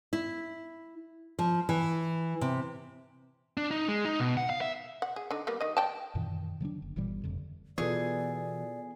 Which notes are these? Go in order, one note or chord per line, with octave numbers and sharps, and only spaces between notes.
E4
F3
E3
C3
D4
D#4
G#3
D#4
B2
F#5
F5
E5
F#5
G#4
D3 D#4
G3 A#3 B3
D#3 D#5
D5 G5 A5
F#2 A#2 D#3 E3
D3 F#3 G#3 D4
F#1
G1 A#2 E3 G3
F1 F2 D3
B2 E3 B3 F4 G#4 A4 D5